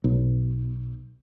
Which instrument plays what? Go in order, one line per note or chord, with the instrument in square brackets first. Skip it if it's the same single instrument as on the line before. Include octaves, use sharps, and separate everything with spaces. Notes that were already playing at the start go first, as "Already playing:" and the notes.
[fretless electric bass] B1